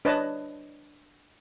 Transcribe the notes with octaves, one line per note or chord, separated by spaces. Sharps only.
D4 B4 C#5 D#5 A5